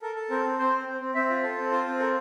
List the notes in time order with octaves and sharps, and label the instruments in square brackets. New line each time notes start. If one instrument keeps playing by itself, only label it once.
[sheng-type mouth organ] A4 A#4
A4
C4 A#4
C4
C4 C5
C4
C4
C4
C4 E5
F4
A4
C4
F4 C5
C4
A4 A#4